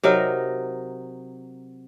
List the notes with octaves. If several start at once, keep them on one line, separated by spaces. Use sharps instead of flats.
C3 F#3 D#4 A#4